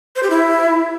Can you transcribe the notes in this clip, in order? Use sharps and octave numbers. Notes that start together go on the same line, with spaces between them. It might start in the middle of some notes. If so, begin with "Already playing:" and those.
C5
G4
E4